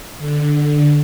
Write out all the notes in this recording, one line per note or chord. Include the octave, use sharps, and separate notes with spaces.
D3